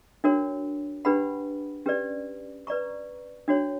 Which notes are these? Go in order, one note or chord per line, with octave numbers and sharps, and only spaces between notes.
D4 F#4 A#4 C#5
D4 G4 B4 F#5 B5
C#4 G4 B4 D5
B4 D5 A#5 C#6
D4 F#4 C#5